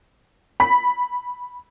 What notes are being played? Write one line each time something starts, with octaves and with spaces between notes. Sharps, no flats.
B5 B6